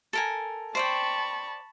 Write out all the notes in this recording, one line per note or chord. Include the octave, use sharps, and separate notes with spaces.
A4 A#4 G#5
C5 D5 G5 A5 B5 C#6